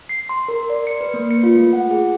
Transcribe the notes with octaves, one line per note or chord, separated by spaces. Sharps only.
C7
C6
A#4
D5
C#7
B4
A#3
C#7
F4
A3
F#5
G#4